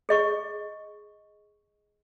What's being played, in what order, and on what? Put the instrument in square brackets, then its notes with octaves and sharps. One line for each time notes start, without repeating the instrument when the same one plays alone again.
[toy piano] G#4 D#5 C#6